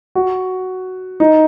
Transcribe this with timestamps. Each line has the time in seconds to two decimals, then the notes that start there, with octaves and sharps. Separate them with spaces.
0.15 F#4
1.20 D#4